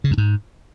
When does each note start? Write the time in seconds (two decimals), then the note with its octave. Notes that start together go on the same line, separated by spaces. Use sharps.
0.04 C#3
0.11 F#2
0.18 G#2